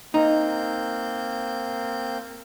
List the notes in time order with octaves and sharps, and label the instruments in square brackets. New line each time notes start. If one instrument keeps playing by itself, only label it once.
[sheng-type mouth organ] A#3 C4 G6 [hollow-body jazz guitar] D#4